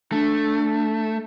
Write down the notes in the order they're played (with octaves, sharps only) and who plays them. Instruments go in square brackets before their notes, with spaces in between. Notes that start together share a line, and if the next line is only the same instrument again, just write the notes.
[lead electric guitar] A3 [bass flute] D4